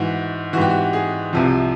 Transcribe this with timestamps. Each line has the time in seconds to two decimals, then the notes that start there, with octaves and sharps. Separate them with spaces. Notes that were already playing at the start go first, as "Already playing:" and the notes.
Already playing: G#2 E3 F#4
0.53 E3 F#4
0.57 G#2 G4
0.70 F#4
0.93 G#4
1.33 C2 C3 F3